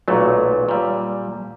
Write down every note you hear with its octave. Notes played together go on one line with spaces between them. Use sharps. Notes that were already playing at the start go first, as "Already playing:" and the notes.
B1 A#2 F#3 A3
A#2 G3